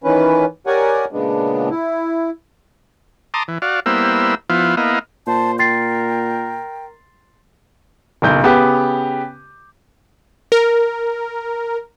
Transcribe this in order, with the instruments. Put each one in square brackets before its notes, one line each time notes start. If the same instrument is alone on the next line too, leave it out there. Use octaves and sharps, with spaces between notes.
[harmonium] D#3 E3 C#4 B4
G4 A#4 C#5 D5 F#5 G#5
A#2 C#3 G#3 B3 D4
E4
[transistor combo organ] A5 A#5 C6 D6 D#6
E3
F#4 D5 F5
G3 A#3 B3 E4 C5 E6
F3 B3 E4 F4
A#3 B3 E4 D#5 F5
[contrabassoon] A#2 [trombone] C5 [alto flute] A5
[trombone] A#4 [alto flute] G5 [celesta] C6 A6 C7
[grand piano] F#1 B1 G6
C#3 B3 G4
[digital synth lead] A#4